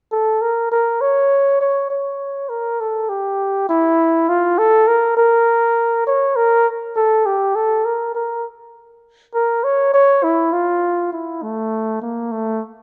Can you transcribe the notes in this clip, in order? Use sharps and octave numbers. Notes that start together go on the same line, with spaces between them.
A4
A#4
A#4
C#5
C#5
C#5
A#4
A4
G4
E4
F4
A4
A#4
A#4
C#5
A#4
A4
G4
A4
A#4
A#4
A#4
C#5
C#5
E4
F4
E4
A3
A#3
A3